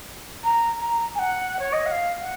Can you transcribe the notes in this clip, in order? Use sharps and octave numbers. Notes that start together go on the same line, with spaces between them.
A#5
A#5
G#5
F#5
C#5
D#5
F#5
F5
F#5